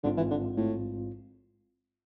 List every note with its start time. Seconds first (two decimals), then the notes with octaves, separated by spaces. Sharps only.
0.03 A1 G#2 D3 G#3 C4 F4
0.17 E3
0.30 D3
0.57 A2